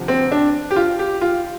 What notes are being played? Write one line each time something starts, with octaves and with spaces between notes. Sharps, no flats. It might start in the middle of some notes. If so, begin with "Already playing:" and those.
Already playing: D2 C3 F3
C4
D4
G4
F4
G4
F4